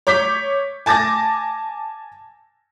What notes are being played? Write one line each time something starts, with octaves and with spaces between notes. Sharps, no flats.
C#5 D6 G6 B6
G#5 A5 D6 A6 A#6